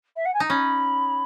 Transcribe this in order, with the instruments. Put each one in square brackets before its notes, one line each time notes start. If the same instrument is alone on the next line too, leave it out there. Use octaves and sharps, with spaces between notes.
[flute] E5
F#5
G#5
[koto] D#4 [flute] A#5
[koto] C#4 [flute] B5